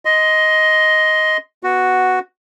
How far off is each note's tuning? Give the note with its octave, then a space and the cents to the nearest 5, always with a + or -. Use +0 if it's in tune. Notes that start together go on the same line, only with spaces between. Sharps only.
D#5 +10 C6 +0
B3 +0 F#4 +0